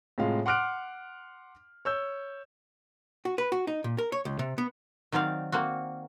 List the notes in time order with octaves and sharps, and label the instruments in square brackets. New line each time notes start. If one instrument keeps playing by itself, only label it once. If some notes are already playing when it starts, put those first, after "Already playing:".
[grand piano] A2 C3 G#3 F4 F5
F#5 C6 D6 F6 F#6 D7
C#5 E6 G6
[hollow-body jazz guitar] F#4
B4
F#4
D#4
A#2
A#4
C#5
C#2
C3
B3
[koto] D#3 F#3 C4 D5 F5
A#3 C4 F#4